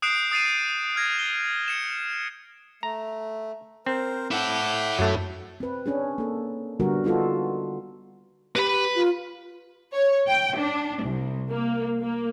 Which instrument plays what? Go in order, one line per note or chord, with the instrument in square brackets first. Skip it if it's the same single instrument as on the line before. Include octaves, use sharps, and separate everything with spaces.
[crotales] D#6 F#6 G6 C7 D7 E7
D#6 A6 C7 D#7 E7
F6 G#6 A#6
G7
C#7 E7
[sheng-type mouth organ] A3 [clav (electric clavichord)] A#5
[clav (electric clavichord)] C4 [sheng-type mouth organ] A#4 C5
[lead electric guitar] E4 A4 [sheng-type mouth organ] F#5 D6 G6
[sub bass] F#2 [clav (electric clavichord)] F#3 A3
[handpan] C4 B4
C#4 D4 G#4
A#3 A4
D3 G3 B3 F#4 A#4
B3 D#4 F4 F#4 A4
[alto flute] G4 [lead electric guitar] B4 B5
[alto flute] F4
[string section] C#5
G5
D4
C2
A#3
A#3